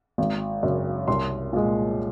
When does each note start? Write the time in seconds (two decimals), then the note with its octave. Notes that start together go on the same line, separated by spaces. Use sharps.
0.18 G#1
0.63 F#2 C#3
1.08 C2 C6
1.53 A#2 G#3